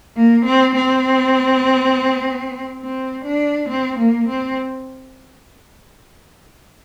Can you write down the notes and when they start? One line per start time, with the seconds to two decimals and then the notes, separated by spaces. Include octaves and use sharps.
0.17 A#3
0.46 C4
0.76 C4
2.81 C4
3.25 D4
3.69 C4
3.99 A#3
4.28 C4